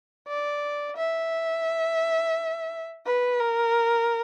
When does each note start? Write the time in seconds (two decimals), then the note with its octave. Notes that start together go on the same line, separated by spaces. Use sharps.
0.27 D5
0.97 E5
3.06 B4
3.40 A#4